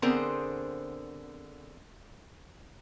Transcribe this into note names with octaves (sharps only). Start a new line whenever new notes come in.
D3 B3 C4 G#4 A#4 C5